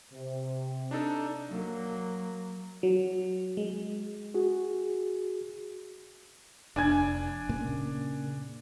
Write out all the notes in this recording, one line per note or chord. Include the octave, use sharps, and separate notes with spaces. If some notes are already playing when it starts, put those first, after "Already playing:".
C3
D4 D#4 A4
F#3 A#3
F#3
G#3
F#4 G#4
F1 D4 G#5 G#6
A#2 C#3 A#3